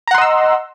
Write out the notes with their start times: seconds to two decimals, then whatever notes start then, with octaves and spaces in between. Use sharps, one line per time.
0.07 A#5
0.11 F#5
0.15 C6
0.18 D#5
0.22 E6